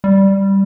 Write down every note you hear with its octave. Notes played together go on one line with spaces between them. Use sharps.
G3